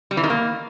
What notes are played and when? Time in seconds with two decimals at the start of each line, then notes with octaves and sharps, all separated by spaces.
0.11 G3
0.17 E3
0.23 D#3
0.30 A#3